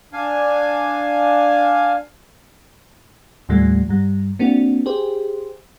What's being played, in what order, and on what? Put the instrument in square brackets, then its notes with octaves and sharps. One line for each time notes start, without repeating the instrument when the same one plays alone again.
[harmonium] D4 F5 G#5
[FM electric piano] D#2 A2 F3 G3 A3
G2 G3
A#3 C4 D4 F#4
G4 G#4 C5